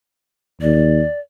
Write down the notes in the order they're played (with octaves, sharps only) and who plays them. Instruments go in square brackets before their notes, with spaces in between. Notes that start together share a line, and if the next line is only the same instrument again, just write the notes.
[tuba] D#2 [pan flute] D5